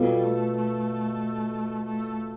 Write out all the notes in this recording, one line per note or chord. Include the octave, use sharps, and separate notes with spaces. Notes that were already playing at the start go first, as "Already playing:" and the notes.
Already playing: B2 G3 B3 F4 A4
A3
A3
A3